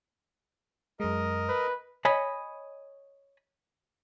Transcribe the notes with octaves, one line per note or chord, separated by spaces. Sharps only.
F#2 G#3 A#4 D#5
B4
C#5 D#5 G#5 B5